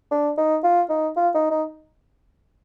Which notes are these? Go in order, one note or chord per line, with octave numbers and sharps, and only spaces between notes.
D4
D#4
F4
D#4
F4
D#4
D#4